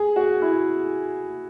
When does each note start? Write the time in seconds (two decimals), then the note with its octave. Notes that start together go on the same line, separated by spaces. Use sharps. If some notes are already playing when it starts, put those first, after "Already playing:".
Already playing: G#4
0.16 F#4
0.42 E4